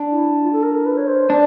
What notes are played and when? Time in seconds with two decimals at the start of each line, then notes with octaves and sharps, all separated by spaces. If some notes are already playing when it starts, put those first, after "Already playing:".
Already playing: D4
0.11 E4
0.41 F4
0.53 A4
0.63 A#4
0.85 B4
0.97 C#5
1.07 C5
1.30 D4 D5